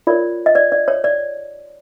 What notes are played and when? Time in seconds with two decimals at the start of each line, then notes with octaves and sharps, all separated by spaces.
0.07 F4 A#4 C#5 D5
0.46 D#5
0.55 D5
0.72 D5
0.88 C#5
1.04 D5